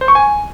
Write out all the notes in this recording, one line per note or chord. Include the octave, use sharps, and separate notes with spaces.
C5
C#6
G#5